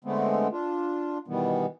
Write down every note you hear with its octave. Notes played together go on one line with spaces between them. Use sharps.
D3 G#3 A3 B3 C4
D4 F4
B2 D#3 E3 G3 B3